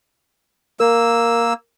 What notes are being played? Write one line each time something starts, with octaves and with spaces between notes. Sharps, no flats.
A#3 A#4 E6